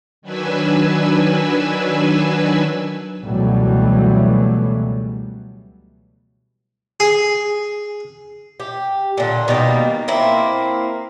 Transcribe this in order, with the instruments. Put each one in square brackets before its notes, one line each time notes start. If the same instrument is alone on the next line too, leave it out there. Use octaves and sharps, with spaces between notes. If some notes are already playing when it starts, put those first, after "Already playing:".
[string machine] D#3 F#3 D4 B4 G#5 E6
[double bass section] C#2 B2 E3 F#3 G3 A3
[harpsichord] G#4
[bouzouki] G4
A#2 D3
B2 D#3 G3 A#3
A#3 C4 E4